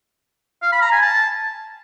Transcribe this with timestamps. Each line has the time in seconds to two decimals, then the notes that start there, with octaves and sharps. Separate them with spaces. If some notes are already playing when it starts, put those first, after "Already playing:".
0.62 F5
0.72 B5
0.82 A#5
0.92 G#5
1.02 A5